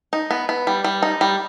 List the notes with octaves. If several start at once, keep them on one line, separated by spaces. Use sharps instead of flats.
D#4
B3
B3
G3
G3
D#4
G3